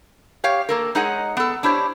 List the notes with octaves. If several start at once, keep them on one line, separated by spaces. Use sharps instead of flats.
G4 C#5 F5
A#3 A4 A#4
G#3 D#4 G#4 C#5 D#5 F#5
B3 A4
D4 E4 G4 C5 C#5